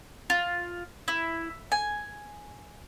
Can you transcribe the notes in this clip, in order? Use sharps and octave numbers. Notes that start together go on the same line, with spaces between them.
F4
E4
G#5